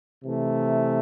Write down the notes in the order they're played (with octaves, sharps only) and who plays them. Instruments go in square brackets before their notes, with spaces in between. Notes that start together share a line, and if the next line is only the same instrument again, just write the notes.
[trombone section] C3 E3 A3